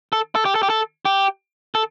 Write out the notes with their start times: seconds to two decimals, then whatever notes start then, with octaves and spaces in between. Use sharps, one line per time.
0.13 A4
0.35 A4
0.45 G4
0.55 A4
0.63 G4
0.70 A4
1.05 G4
1.75 A4